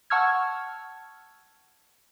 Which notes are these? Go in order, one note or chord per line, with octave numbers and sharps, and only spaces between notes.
F#5 A5 C#6 E6 F6 G#6